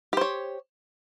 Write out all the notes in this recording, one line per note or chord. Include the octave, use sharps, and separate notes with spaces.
G4 C5 C#5